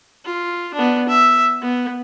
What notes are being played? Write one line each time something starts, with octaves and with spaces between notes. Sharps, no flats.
F4
B3 D4
E5
B3